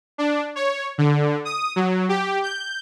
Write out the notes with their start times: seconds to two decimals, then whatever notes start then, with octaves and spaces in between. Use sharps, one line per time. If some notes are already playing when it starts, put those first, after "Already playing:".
0.18 D4
0.56 C#5
0.98 D3
1.45 D#6
1.76 F#3
2.09 G4
2.43 G6